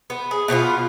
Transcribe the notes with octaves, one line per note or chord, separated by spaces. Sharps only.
B3
G#4
B2 B3 D4 F4